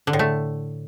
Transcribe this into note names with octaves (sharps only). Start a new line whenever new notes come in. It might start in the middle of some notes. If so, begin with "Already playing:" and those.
D3
A2
A3